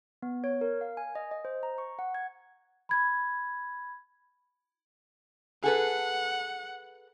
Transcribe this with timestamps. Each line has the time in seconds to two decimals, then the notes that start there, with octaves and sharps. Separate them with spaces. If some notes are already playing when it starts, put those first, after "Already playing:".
0.22 B3
0.44 C#5
0.61 A#4
0.81 F5
0.97 G#5
1.15 D#5
1.31 D#5
1.45 C5
1.63 A#5
1.78 C#6
1.99 F#5
2.15 G#6
2.89 B5 G#6
5.64 G#4 A4 B4 F#5